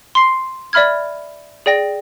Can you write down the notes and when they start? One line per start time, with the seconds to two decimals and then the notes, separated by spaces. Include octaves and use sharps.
0.15 C6 C7
0.73 D5 E5 B5 F6 G#6
1.66 G#4 D5 G5 A#6